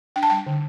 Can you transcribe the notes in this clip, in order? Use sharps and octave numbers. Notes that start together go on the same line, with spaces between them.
D4 G5
A5
G3 G5
D3